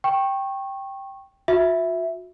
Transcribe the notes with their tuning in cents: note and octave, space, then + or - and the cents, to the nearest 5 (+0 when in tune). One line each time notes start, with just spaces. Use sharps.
G5 +0 C#6 -25
F#4 -45 E5 +0